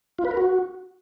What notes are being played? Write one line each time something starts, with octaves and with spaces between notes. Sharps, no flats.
F4
B4
A#4
F#4